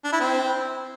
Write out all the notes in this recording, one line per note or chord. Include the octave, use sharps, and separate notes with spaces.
D4
E4
C4